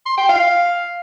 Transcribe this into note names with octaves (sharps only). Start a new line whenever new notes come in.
C6
G5
F5